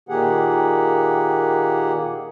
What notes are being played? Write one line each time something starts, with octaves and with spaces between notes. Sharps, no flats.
A#2 D#3 A#3 G4 G#4 F#5